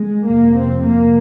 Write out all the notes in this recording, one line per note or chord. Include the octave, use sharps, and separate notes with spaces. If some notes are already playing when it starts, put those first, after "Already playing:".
Already playing: G#3
F2 C3 A#3
C4
A#3